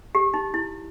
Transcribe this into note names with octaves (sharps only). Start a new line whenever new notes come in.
G4
D#4
E4